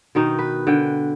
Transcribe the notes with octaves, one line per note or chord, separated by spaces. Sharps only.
B2 D#3 D#4
B4
D3 G5